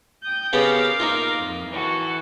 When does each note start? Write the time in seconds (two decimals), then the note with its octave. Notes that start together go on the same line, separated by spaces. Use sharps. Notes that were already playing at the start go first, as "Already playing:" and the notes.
0.24 G5 D#6 G6
0.53 C#3 B3 G4 A#4 F5 D6
1.00 A#3 D#4 F4
1.39 F2
1.70 E3 F#4 A4